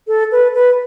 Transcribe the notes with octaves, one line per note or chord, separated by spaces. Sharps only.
A4
B4
B4